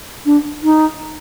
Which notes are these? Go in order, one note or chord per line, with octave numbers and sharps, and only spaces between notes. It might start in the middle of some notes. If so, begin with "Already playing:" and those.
D4
D#4